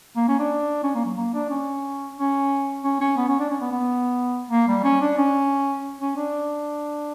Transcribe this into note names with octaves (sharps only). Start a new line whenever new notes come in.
A#3
C#4
D4
C#4
A#3
F#3
A#3
D4
C#4
C#4
C#4
C#4
B3
C#4
D4
C#4
B3
B3
A#3
G3
C#4
D4
C#4
C#4
D4